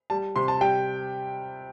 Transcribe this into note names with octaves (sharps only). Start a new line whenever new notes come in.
G3 A5
C3 C6
A5
G3 G5